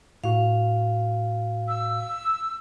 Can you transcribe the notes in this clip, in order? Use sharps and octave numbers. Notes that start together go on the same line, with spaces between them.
A2 F#4 F5
E6